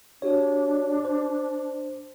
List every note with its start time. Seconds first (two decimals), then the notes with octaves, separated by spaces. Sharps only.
0.22 D4 F#4 G4 C#5
1.05 C5